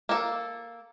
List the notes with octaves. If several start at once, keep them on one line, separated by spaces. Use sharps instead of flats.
A#3 A4